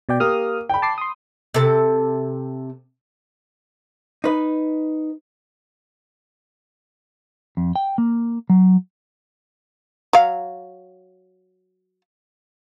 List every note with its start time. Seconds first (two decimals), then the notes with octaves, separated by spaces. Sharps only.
0.09 B2 D5 G5
0.20 A#3 G4 D#6 F6
0.69 G5 B5
0.82 A5 D6 C7
0.98 C6 D#6
1.54 C3 A4
4.24 D#4 B4
7.57 F2
7.76 G5
7.98 A#3
8.50 F#3
10.13 F#3 F5